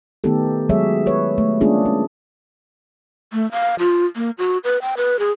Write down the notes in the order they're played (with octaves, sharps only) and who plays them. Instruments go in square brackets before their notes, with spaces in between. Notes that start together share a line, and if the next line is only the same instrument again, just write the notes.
[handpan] D#3 A3 B3 D#4 G4 A4
F#3 G#3 G#4 C#5 E5
B4 C#5
A3
G#3 A#3 C#4 D4 F4 G#4
C#4
[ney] A3
F5
F4
A#3
F#4
B4
G5
B4
G#4